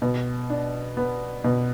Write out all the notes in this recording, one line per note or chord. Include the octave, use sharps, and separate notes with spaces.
B2
D4
B3
B2